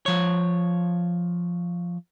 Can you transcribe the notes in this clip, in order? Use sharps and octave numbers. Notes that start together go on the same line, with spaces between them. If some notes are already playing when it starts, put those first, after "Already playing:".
F3 C#5